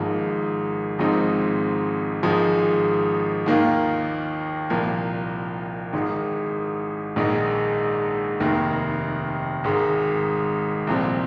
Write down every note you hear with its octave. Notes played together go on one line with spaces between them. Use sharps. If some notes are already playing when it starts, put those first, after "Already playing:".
Already playing: G#1 G#2 F3 A#3
G#1 G#2 F3 C4 D#4
G#1 G#2 F3 G#3
D#2 D#3 A#3 F4
C2 A#2 F3 A#3
G#1 G#2 D#3
A#1 G#2 D#3 G#3 D#4
F1 D#2 D#3
G#1 G#2 G#3
C2 A#2 F3 C4